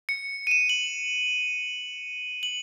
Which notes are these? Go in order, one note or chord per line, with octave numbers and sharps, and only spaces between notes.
C#7
D#7
E7
F#7
F#7